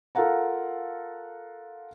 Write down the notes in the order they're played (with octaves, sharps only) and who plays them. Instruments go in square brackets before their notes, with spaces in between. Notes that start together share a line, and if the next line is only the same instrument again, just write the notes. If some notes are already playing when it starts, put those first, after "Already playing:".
[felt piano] F4 A4 A#4 F5 F#5 A#5